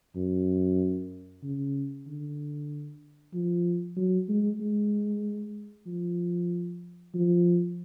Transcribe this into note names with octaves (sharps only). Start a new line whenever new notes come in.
F#2
C#3
D3
F3
F#3
G#3
G#3
F3
F3